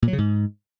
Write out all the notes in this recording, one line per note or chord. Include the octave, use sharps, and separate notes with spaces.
A#2
F#3
C#3
G#2